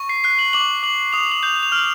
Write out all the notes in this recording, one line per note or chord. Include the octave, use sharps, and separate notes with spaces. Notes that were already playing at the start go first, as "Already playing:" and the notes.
Already playing: C#6
C7
F#6 C7
F#7
D6 F#7
D6 F#7
D#6 F7
F#7
G6 F7
F7
F6 F#7